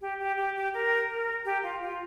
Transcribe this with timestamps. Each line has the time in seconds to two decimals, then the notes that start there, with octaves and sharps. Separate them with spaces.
0.01 G4
0.20 G4
0.37 G4
0.56 G4
0.74 A#4
1.09 A#4
1.45 G4
1.63 F4
1.82 F4